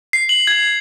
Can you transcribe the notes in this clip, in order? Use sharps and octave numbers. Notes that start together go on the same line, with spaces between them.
C7
F#7
G#6